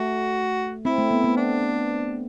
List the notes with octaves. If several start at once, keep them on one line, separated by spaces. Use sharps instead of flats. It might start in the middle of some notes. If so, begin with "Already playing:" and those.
Already playing: A3 F#4
C4 E4
A3
B3
B3
D4